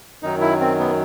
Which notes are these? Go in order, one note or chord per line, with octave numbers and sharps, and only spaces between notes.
F#2 D#3 F#3 D#4
E4
C4
B3